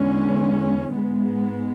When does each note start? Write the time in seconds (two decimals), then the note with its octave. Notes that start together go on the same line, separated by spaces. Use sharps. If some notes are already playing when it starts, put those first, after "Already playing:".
Already playing: E2 D3 G#3 C#4
0.92 G#2 G#3 B3